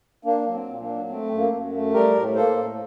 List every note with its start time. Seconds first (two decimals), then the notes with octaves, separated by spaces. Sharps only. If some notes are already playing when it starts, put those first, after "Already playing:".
0.25 A#3 D4
0.46 F#3
0.54 C4
0.67 A#2
0.81 A#3 D4
0.89 F#3
1.09 A3 C4
1.31 F#2
1.38 A#3
1.52 F#2
1.73 A3
1.94 G3 G4 A#4
2.15 A2
2.35 A#3 A4 C5
2.57 A2